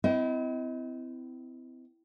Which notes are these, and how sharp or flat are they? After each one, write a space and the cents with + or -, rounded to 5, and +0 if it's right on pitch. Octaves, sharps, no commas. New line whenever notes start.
C4 -35 E4 +0 D#5 +25